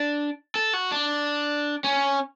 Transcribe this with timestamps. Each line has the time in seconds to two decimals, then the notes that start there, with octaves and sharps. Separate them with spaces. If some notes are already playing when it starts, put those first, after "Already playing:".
Already playing: D4
0.56 A4
0.74 F#4
0.92 D4
1.84 C#4